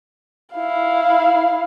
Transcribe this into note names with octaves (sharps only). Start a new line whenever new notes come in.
E4 F5